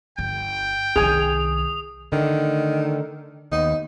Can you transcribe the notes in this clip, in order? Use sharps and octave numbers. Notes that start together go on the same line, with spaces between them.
G1 G5
C2 D#3 G#4 G#5 D#6 F7
D3 D#3 A3
D#2 B3 D#4